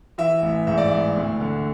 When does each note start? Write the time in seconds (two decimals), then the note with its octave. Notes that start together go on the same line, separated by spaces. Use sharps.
0.18 E3 E5
0.42 A1
0.67 G#2 E5
0.78 D5
0.89 A1 E5
1.16 D2
1.40 D3